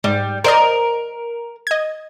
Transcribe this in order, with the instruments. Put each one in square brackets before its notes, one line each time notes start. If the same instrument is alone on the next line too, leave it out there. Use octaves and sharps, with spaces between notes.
[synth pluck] G#2 [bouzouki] G3
[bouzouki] A#4 [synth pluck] C5 D5 D#5
[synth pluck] D#5 G#6